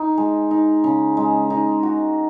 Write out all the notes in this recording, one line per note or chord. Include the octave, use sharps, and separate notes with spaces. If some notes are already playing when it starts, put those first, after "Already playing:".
Already playing: D#4
G#3
D#4
C#3
G#3
D#4
F#4